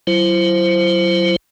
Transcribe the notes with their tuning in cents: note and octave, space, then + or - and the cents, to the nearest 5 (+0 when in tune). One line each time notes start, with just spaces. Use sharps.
F#3 +20 E4 +45 C5 +0